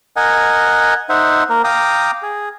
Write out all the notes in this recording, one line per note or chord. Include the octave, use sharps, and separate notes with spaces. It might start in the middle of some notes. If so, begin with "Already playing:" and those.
A#4 D#5 F#5 G#5
D#4 C5 E5 F#5
A#3 A#4
F5 G5 A#5 D6 D#6
G#4